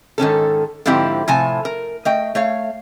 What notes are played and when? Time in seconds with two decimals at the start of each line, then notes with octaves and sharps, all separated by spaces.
0.18 G#2 D#3 C#4 A4
0.86 G#2 D3 F3 C4 E4 G4
1.28 A2 C3 F3 G#5 A5
1.65 A#4
2.05 A3 D#5 G5
2.35 A3 C#5 F5